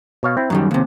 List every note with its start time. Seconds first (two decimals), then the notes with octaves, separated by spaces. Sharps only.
0.23 B2 C#5 F5
0.37 C4 E4
0.50 F#2 D#3 G3 A#5
0.71 D#2 C3